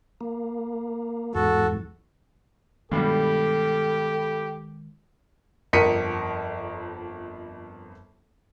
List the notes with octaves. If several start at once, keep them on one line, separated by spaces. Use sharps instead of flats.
A#3
E2 G#2 F#4 A4
G2 B2 D#3 G3 G#3 G4 A4
G1 F2 A#4 B6 C#7 D#7